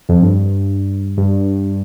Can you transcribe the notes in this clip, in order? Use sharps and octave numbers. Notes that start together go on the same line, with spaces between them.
F2
G2
G2